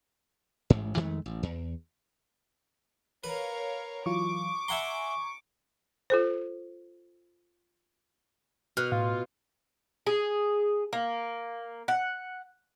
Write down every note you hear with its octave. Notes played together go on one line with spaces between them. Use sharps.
A1 G#2
F2 D#3 G#3 A3
A1
E2
A#4 B4 C#5 F5
E3 F#3 F4 C#6 D6
E5 F#5 G#5 A#5 C6
F4 A4 C5
B2 F6 F#6
A2 F4
G#4
A#3
F#5